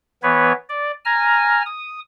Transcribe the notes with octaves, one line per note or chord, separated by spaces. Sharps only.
E3 B3 B4 C#5
D5
G#5 A#5 F6
D#6